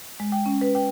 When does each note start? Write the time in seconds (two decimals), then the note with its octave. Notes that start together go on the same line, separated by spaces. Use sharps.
0.20 G#3
0.32 G5
0.46 C#4
0.61 B4
0.75 G5